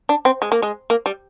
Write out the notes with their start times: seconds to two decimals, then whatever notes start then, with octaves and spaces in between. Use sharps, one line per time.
0.09 D4
0.25 C4
0.42 G#3
0.52 A#3
0.62 G#3
0.90 A#3
1.06 G3